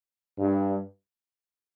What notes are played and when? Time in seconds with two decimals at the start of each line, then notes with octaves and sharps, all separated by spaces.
0.38 G2